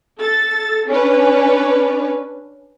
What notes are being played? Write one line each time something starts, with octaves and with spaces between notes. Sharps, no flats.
A4 A6
C#4 D4 B4